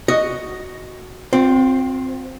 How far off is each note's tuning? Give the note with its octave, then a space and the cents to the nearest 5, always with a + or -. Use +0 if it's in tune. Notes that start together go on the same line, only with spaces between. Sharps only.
F#4 +0 D#5 +0
C4 +0 F4 +45